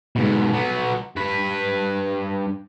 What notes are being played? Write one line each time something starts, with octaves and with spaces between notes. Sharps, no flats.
G#2 B2
F#3 B3
G2 B4